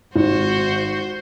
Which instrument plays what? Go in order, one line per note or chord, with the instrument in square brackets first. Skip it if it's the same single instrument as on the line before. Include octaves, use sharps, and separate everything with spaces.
[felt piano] G#1 [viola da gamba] F#4 C5